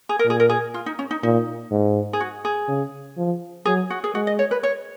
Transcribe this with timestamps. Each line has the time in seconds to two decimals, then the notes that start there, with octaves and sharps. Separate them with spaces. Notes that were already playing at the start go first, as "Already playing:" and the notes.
0.09 G#4
0.19 A#4
0.25 A#2 G#4
0.40 A#4
0.49 G#4
0.74 F4
0.86 D#4
0.99 C#4
1.11 D#4
1.23 A#2 D#4
1.71 G#2
2.13 G#4
2.20 F#4
2.45 G#4
2.68 C#3
3.17 F3
3.65 F#3 G#4
3.90 F#4
4.04 G#4
4.14 G#3 F#4
4.27 D#5
4.39 C#5
4.51 B4
4.63 C#5